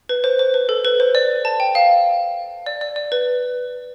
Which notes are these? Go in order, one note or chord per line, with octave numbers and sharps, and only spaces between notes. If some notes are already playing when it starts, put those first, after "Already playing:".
B4
C5
C5
B4
A4
B4
C5
D5
A5
G5
F5
D5
D5
D5
B4